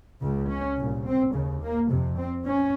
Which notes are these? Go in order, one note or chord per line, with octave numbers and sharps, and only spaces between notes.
C#2 C#3
C#4
C2 A#2
C4
D#2 C#3
A#3
F2 C3
C4
C#4